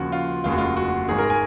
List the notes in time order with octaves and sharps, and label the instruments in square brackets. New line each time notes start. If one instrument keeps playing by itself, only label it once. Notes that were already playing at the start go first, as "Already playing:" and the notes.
Already playing: [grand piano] D#2 C#3 F3 F#4
F4
F1 D#2 C#3 G#3 F4
F#4
F4
F#4
G#1 G#2 D#3 G#4
A#4
G#5